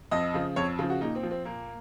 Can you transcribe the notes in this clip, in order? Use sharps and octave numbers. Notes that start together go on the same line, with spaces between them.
F2 D#5
C#3 F3
F2 C#5
C#3 F3
F#4
A#2 D#4
C4
F3
C4
A#2 A#3